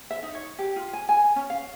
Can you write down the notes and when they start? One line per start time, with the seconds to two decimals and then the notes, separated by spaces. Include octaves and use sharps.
0.11 E5
0.23 D#4
0.35 C#5
0.59 G4
0.76 F4
0.93 G#5
1.09 G#5
1.36 C#4
1.50 F5